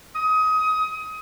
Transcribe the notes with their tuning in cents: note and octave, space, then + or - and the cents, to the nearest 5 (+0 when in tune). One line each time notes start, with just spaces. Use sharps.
D#6 +25